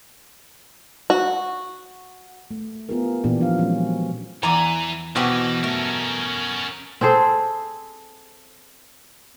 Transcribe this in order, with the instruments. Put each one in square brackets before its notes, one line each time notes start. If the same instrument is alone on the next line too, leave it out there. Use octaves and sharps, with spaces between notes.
[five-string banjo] F#4
[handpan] A3
B3 E4 F4 G4 G#4 A#4
A#2 E3 B3 D4 G4
A#2 F3 C4 D4 F5
F#3 G#3 C#4 D4
[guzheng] E2 D5 [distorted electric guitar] E3 G#5 [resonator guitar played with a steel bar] A#5
[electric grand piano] B2 [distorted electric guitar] E3 [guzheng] C4 F#4 G4
[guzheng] A3 [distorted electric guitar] C#4 A#4
[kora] C4 G#4 A4 C5